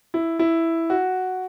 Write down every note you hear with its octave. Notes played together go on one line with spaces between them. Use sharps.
E4
E4
F#4